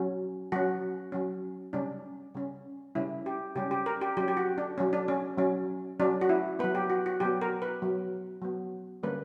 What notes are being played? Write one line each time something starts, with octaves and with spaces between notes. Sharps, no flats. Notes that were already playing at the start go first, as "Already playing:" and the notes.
Already playing: F#3 C#4
F#3 C#4 F#4
F#3 C#4
C#3 G3 C#4 D4
C#3 G3 C#4
C#3 G3 C#4 E4
G4
C#3 G3 C#4 G4
G4
A#4
G4
F#3 C#4 G4
G4
F#4
D4
F#3 C#4
D4
C#4
F#3 C#4
F#3 C#4 D4
F#4
E4
F#3 B3 B4
G4
F#4
F#4
F#3 B3 G4
A#4
B4
F#3 B3
F#3 B3
D3 G3 A#3 C#4 B4